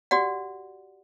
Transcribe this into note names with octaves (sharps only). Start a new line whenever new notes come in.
F#4 G4 D5 F#5